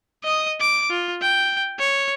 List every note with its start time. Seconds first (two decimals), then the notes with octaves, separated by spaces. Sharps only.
0.24 D#5 D#6
0.61 D6
0.90 F4
1.22 G5
1.79 C#5